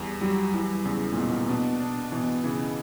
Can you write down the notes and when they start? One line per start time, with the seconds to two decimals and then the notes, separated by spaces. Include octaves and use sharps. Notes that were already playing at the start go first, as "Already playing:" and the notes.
Already playing: E2 G3
0.21 F#3 G3
0.53 E3 G3
0.85 E2 C#3
1.13 A#2
1.17 B2 A#3
1.49 B2 D4
1.80 D4
2.12 B2 E3
2.44 C#3 E3